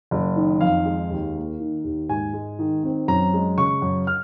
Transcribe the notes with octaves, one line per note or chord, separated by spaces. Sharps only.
F#1
D#3
F2 F5
G#3
D#2
A#3
D#3
D#2
G#2 G#5
G#3
D#3
C4
F#2 A#5
G#3
C#3 C#6
F#2
F6